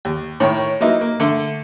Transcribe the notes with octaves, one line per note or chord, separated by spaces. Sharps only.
D#2
A2 D#3 C#5
F#3 A#3 D#4 E4 B4 D#5
A#3
D3 A3